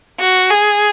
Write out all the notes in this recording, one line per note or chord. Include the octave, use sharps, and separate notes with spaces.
F#4
G#4